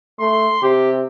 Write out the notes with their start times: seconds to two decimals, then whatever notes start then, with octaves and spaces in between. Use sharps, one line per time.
0.20 A3 C6
0.62 C3 G4